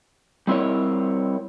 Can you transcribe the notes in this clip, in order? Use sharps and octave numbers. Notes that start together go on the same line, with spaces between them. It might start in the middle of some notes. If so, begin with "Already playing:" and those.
G3 C4 E4 A#4 C#5